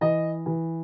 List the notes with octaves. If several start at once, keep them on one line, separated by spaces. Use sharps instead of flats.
E3 D#5
E3